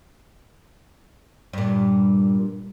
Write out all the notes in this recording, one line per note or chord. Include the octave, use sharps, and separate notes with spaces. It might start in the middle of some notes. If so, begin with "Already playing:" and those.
G2 A#2